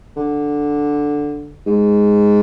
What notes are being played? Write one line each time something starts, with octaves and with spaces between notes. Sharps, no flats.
D3
G#2